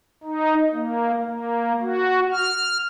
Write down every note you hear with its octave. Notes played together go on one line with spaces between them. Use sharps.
D#4
A#3
A#3
F#4
F6